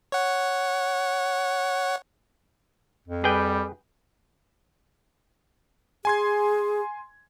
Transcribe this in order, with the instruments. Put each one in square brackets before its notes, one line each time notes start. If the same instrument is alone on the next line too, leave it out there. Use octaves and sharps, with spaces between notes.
[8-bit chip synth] C#5 F#5
[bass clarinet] F2
[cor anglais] G3 [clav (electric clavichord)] G#4 B4 G5
[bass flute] G#4 [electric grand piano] G#5 C6 G#6